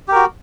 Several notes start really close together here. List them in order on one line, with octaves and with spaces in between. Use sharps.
G4 A#4 F#4